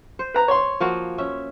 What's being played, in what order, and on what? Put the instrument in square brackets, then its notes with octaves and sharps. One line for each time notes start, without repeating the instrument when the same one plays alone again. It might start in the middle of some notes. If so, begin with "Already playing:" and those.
[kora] C5
[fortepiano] B4 A#5
C#5 C6
[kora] F3 A#3 F#4
C#4 E5